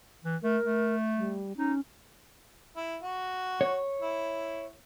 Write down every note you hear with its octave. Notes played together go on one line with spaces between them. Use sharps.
E3
A3 A#4
A3
G3
C#4 D#4
E4
F#4
C#5
E4